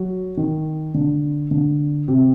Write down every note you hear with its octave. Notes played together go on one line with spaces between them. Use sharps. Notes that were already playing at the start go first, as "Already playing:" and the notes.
Already playing: F#3
D#3
D3
D3
C3